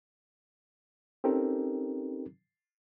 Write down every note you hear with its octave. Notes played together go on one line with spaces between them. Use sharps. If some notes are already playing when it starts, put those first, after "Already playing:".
C4 C#4 D#4 G4 A4 A#4